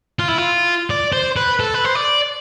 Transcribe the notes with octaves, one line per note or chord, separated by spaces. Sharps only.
F4
E4
F4
D5
C5
B4
A4
B4
C5
D5